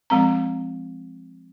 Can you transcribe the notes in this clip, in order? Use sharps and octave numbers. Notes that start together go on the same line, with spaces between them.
F3 G#3 C4 A#5